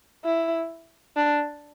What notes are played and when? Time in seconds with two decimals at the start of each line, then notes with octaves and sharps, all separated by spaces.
0.25 E4
1.17 D4